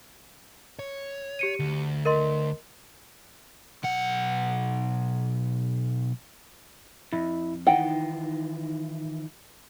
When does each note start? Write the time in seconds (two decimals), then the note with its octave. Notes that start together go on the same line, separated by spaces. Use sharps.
0.79 C#5
1.39 G4 C#7 D#7
1.60 D2
2.05 A#4 D#5 C6
3.83 B1 F#5
7.12 F2 E4
7.67 D#3 E3 D#4 F4 F#5 G5